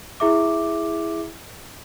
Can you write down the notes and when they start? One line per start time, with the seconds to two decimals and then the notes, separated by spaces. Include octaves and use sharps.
0.20 E4 G#4 E5 D6